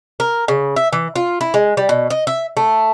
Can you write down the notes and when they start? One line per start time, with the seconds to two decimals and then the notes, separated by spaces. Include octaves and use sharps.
0.20 A#4
0.48 C#3
0.76 E5
0.93 E3
1.16 F4
1.41 E4
1.54 G#3
1.77 G3
1.89 B2
2.10 D#5
2.27 E5
2.57 A3